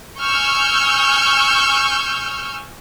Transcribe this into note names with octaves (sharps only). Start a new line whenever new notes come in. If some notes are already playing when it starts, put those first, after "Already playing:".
G#5 C#6 E6 F6 G6